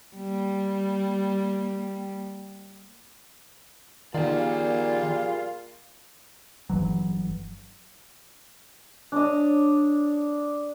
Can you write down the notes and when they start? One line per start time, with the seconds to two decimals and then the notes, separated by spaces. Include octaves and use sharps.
0.16 G3 A#3
4.14 A#2 D#3 G3 A#3 F4 G#4 D5
6.70 G1 E3 F#3
9.12 D4 C#5 D#5